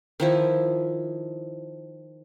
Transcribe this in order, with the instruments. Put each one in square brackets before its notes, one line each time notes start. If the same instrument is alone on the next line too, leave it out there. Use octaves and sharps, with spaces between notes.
[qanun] D#3 F3 E4